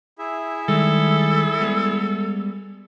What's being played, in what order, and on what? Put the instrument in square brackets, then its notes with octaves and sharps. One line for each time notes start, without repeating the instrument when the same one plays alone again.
[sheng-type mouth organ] E4 G#4 E5
[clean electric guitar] D#3 G3 G#3 [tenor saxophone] A4
[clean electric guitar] G3 G#3 B3